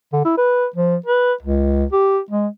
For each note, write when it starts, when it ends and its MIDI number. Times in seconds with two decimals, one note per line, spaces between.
0.13 0.21 50
0.25 0.37 64
0.37 0.66 71
0.76 0.96 53
1.06 1.33 71
1.42 1.84 37
1.92 2.19 67
2.30 2.47 56